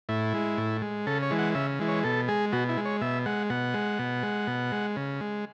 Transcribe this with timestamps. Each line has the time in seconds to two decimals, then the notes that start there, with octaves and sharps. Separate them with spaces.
0.09 A2 E4
0.34 G#3
0.58 A2
0.82 G#3
1.07 C#3 A4
1.22 C#5
1.30 E3 G#3
1.39 F#5
1.55 C#3 E5
1.80 E3 G#3
1.88 C#5
2.04 B2 A4
2.28 G#3 G#4
2.53 B2 F#4
2.69 E4
2.77 G#3
2.85 C#5
3.02 B2 E5
3.26 G#3 F#5
3.50 B2 F#5
3.74 G#3
3.99 B2
4.23 G#3
4.47 B2
4.72 G#3
4.96 C#3
5.21 G#3